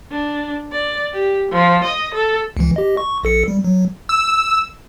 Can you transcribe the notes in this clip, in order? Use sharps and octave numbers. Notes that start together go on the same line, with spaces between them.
D4
D5
G4
F3
D#5
A4
C#2 E3
G4 D#5
C#6
A#1 A4 C#7
G3
F#3
E6